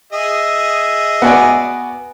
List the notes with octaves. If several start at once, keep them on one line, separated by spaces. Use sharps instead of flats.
G#4 D#5 E5
B3 F#4 D5 F#5 G#5